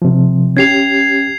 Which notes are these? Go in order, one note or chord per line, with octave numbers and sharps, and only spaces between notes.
C3 F3
C#4 G4 G#6 C7 F7